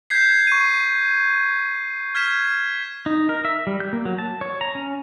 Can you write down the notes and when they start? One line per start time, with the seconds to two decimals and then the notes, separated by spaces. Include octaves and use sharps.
0.10 G6 G#6 B6 C7
0.47 C#6 D#7
2.15 F6 G#6 B6 E7
3.06 D#4
3.29 A#4
3.45 E5
3.67 G3
3.80 G6
3.93 A#3
4.05 F#3
4.18 A5
4.41 C#5
4.61 A#5
4.75 C#4